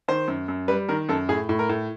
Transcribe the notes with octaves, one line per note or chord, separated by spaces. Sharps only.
D#3 C5
F#2
F#2
G3 B4
D#3 A#4
F#2 A4
A2 G#4
A2
A#4
A2